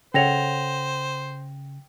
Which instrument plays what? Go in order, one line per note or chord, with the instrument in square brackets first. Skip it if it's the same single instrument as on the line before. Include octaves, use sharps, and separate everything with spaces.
[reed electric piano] C#3 [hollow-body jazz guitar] A4 C#5 F#5 [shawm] C5 [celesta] G5 A#6 F7